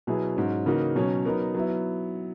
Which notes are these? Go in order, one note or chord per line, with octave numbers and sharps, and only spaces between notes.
B2 F#3 B3 E4 G#4
G#2 F#3 C#4
C#3 E3 A#3 D#4 F#4
B2 F#3 C#4
F#3 B3 D#4 A#4
F#3 B3 E4